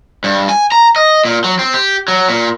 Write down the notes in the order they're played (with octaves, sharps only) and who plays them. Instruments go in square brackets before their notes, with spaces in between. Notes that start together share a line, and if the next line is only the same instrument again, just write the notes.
[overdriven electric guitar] G2
G#5
A#5
D#5
A#2
F#3
C4
G4
F#3
A#2